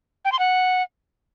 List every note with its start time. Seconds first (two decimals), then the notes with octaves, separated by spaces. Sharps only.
0.25 G5
0.32 C6
0.39 F#5